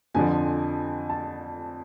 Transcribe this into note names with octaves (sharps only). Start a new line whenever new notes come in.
F2 D3 F3 G#5
A5